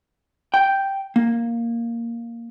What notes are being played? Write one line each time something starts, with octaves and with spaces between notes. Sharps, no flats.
G5
A#3